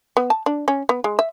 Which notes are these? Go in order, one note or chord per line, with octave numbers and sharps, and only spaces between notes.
B3
A5
D4
C#4
B3
G#3
E5